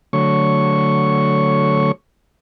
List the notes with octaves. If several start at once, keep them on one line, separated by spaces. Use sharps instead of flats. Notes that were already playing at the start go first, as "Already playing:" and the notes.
D3 F#3 A3 C#5 C#6